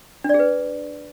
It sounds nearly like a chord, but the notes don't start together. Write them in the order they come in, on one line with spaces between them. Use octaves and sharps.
D4 D5 G#4 B4